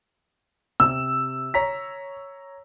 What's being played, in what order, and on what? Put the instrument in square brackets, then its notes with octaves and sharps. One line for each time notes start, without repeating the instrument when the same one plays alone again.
[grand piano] C3 [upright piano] E6
[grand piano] C#5 A#5 B6